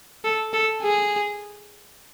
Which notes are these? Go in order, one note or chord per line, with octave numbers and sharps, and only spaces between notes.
A4
A4
G#4